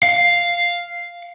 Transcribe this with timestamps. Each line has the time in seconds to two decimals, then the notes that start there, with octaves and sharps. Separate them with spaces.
0.03 F5